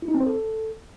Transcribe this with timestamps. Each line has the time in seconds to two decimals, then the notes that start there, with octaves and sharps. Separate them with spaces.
0.02 E4
0.08 D#4
0.14 C4
0.20 C5
0.26 A4